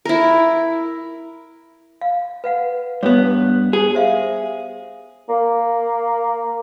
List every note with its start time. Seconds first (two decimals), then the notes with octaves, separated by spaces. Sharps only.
0.05 E4 A#4
2.01 F5
2.44 B4 F5 F#5
3.03 G2 B3 C#5
3.73 G4 G#4
3.95 C5 E5 F5
5.29 A#3